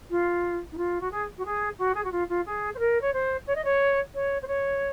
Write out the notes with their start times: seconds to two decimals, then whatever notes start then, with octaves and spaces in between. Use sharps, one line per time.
0.10 F4
0.72 D#4
0.77 F4
1.00 F#4
1.11 G#4
1.37 F#4
1.45 G#4
1.78 F#4
1.94 G#4
2.04 F#4
2.11 F4
2.29 F4
2.46 G#4
2.74 C5
2.78 A#4
3.01 C#5
3.13 C5
3.46 C#5
3.55 D#5
3.64 C#5
4.14 C#5
4.42 C5
4.47 C#5